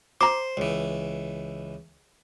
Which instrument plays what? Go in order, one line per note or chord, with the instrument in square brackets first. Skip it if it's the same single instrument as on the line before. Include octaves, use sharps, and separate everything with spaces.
[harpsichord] C5 [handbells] A#5 D6
[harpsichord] C#2 E3